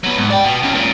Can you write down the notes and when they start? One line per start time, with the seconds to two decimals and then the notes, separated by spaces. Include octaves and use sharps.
0.04 F#3 B3
0.18 G#2
0.30 D5 G5
0.45 B2
0.63 E2 C#3
0.75 C#2 A#2